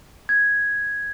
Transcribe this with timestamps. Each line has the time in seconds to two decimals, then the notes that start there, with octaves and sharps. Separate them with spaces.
0.29 G#6